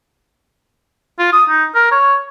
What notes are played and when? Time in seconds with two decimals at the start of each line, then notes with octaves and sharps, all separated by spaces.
1.19 F4
1.33 D#6
1.49 D#4
1.75 A#4
1.92 C#5